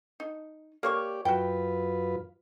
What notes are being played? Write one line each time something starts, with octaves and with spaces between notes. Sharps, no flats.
D#4
A#3 G4 C#5 D5 C#6
F#2 F4 F#4 B4 G5